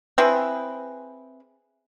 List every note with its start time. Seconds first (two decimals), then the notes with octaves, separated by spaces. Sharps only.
0.18 C4 E4 G#4 B4